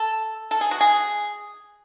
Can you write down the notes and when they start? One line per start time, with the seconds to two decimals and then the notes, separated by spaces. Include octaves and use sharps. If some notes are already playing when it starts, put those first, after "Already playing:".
Already playing: A4
0.51 A4
0.61 G#4
0.71 F#4
0.81 G#4